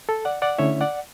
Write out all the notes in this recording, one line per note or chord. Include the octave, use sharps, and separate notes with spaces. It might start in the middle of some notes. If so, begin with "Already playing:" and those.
A4
D5 F#5
D5 F#5
D3 A3 C#4 E4 C#5 E5
D5 F#5